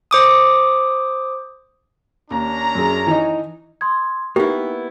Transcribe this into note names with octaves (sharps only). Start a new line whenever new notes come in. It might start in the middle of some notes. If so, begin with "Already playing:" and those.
C5 D6 D#6
D#2 C#4 D4 A#5
F#2 G#4
E3 D#4
C6 D#6 G#6
A#3 B3 D#4 E4 G4 G5